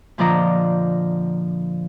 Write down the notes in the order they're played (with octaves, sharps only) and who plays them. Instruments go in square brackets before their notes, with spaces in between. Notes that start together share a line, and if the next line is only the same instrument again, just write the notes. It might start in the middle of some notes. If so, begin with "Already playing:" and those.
[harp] A#2 D3 F3 D5 D#5 A#5